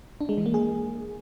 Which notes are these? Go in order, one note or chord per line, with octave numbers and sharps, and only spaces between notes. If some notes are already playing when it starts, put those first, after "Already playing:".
D4
G#3
E3
A#3
G#4